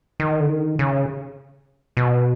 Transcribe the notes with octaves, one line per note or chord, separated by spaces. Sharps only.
D#3
D3
D#3
C#3
B2